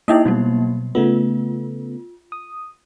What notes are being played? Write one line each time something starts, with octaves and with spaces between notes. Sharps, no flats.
A#3 D#4 E4 D#5 E5 G5
B2 F#3 G3 A#3
C#3 A3 B3 F4
D#6